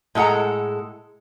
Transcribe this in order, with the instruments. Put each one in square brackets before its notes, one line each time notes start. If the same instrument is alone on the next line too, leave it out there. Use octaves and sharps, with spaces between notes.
[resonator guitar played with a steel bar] A2 G#3 A4 F#5 A#5